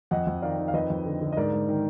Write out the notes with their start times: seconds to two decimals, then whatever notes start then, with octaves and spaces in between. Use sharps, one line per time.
0.11 F2 D#5 F#5
0.27 F2
0.42 D#3 D5 F5
0.58 D#3
0.68 F5
0.74 F2 B4 D#5
0.90 F2
1.06 D3
1.21 D3
1.32 D#5
1.37 G#2 A#4 D5
1.53 G#2
1.69 D#3